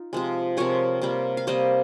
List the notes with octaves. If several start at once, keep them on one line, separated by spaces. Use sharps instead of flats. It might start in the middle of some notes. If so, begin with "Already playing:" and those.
Already playing: D#4 F4
C3 F3 G#3
C3 F3 G#3 A#4 C#5
C3 G3 A#3
F5
C3 G3 A#3 C5 D#5